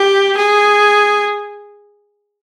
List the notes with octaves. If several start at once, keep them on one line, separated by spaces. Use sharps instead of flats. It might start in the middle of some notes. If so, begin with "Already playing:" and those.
Already playing: G4
G#4